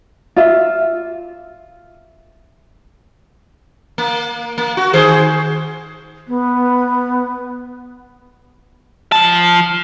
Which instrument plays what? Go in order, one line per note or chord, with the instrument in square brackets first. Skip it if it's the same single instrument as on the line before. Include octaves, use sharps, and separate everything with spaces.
[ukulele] F4 E5
[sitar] A#3
A#3
F#4
D#3 G#4 C5
[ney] B3
[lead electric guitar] F3 A5